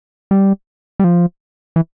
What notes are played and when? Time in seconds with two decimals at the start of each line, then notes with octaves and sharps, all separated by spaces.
0.31 G3
1.00 G3
1.04 F3
1.76 E3